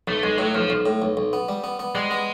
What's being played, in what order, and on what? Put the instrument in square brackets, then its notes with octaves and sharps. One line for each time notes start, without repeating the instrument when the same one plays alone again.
[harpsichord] B1 [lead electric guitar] A3
[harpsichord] B1 [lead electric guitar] G#3
[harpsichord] A2 [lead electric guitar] F#3
[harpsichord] B1 [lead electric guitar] F3
[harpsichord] B1
A2
B1
B1
B3
G3
B3
B3
[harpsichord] G3 [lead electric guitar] G#3
[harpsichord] B3